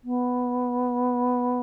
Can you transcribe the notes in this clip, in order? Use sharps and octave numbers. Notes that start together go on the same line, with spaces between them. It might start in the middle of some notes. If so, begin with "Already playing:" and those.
B3